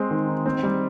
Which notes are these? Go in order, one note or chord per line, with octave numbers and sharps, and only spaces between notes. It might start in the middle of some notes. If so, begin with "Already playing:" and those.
Already playing: G#3 C4
D#3
D#4
C4
G3